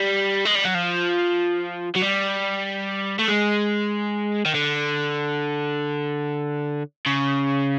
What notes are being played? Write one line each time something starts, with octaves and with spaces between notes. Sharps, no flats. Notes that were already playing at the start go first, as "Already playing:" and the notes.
Already playing: G3
G#3
G3
F#3
F3
F#3
G3
A3
G#3
D#3
D3
C#3